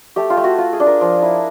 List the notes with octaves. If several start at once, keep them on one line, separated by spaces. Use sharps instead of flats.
A3 G4
F4
A3
F#4
F4
G#4
D4
A#4
F3
E4